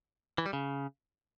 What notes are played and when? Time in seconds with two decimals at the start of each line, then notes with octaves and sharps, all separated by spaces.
0.38 E3
0.46 G3
0.53 C#3